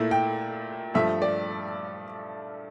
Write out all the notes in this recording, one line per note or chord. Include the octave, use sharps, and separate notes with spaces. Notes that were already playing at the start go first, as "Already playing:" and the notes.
Already playing: A#2 A3 E4
G5
G2 F3 A3 E5
D5